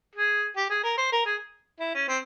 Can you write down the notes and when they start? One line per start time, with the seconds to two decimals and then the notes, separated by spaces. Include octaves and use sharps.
0.16 G#4
0.56 G4
0.70 G#4
0.84 A#4
0.98 C5
1.12 A#4
1.26 G#4
1.80 E4
1.95 C#4
2.08 C4